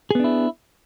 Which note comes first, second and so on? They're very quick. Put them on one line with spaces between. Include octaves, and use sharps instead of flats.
G#4 B3 D4 E4